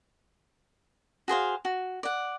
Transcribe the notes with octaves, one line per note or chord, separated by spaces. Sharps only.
F#4 G#4 C5 F5
F#4
D5 F#5